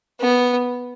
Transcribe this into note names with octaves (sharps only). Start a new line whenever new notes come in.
B3